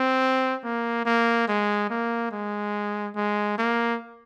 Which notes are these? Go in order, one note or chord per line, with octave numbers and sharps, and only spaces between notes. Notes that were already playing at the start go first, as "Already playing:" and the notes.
Already playing: C4
A#3
A#3
G#3
A#3
G#3
G#3
A#3